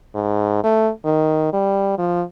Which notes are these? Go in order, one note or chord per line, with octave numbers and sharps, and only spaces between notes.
G#2
A3
D#3
G3
F3